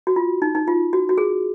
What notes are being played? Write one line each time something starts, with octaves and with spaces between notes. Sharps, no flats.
F#4
F4
D#4
D#4
F4
F#4
F#4
G#4